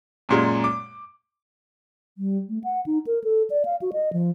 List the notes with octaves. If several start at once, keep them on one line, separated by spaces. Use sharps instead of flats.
F#2 A#2 G#3
D6
G3
A3
F#5
D#4
A#4
A4
D5
F5
F#4
D#5
F3